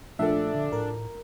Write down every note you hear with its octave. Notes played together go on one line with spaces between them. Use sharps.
A#1 A3 D4 A4 E5
D3
A2 A#4